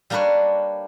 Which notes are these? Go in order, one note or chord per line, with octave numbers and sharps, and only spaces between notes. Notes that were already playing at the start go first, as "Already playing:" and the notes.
G3 A#3 D4 A#4 B4 C#5